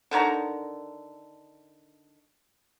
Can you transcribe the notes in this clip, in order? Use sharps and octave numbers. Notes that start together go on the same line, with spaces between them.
D3 D#3 C#5 A#5